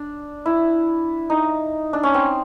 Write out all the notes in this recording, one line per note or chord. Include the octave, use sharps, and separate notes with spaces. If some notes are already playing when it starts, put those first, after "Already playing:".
Already playing: D4
E4
D#4
D4
C#4
C4